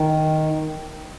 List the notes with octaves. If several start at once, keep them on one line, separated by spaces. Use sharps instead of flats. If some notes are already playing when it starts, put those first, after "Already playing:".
Already playing: D#3